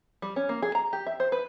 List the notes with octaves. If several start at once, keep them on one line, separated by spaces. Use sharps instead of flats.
G3
C#4
A#3
G#4
A#5
G4
E5
C5
B4